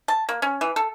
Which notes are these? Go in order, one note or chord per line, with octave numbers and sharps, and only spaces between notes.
A5
A#3
C#4
E3
A4